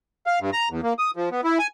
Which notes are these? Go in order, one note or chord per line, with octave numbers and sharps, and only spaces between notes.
F5
G2
A#5
E2
A#3
D#6
F3
B3
E4
G#5